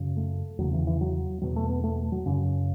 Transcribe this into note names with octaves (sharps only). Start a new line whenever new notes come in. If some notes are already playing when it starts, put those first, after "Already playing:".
Already playing: F#2 C#3
A3
E2 C#3 F#3
E3
E3
F#3
E2 B2 F#3
A3
B3
A3
F#3
F#2 C#3